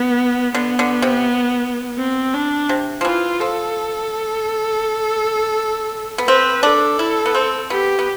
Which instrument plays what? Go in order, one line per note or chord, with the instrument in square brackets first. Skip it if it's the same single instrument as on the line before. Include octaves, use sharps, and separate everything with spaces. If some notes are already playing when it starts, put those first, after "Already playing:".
Already playing: [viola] B3
[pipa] D3 [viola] B3
[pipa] D3
C3
[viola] C4
D4
[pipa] C3
F3
[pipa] E3 [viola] F4
[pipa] F3 [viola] A4
[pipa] B3
[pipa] C4 [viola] B4
[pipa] D4 [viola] A4
[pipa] E4
B3
C4
[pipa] B3 [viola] G4
[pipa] B3